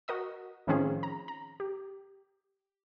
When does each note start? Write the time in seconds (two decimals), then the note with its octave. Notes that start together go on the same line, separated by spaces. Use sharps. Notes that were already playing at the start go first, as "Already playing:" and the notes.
0.08 F#4 A#4 D#5 D#6
0.67 A2 D#3 F3 C4 C#4 G#4
1.03 A#5
1.28 A#5
1.60 G4